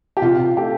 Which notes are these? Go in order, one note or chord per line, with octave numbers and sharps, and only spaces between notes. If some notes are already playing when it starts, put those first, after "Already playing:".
G4
C3 F4
A3 G4